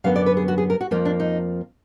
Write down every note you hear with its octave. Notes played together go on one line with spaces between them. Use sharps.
F#2 D3 F#3 B3 F5
D5
B4
G#4
F#4
G#4
A#4
F#4
F2 F3 A#3 F4
D4
D#4